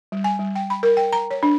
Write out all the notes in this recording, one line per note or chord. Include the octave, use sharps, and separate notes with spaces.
G3
G#5
G3
G5
B5
A#4
G5
A#5
C#5
D4